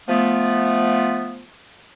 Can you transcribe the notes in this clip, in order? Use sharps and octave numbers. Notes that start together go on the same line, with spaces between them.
F3 A3 B3